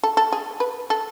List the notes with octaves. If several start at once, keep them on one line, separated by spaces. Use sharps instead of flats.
A4
A4
G#4
B4
A4